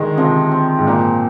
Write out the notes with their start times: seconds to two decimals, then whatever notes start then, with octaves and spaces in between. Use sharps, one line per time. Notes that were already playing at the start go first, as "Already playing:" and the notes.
Already playing: D3 D#3 G#3
0.17 C3 F3
0.52 C4
0.78 G#2
0.87 A#2 A#3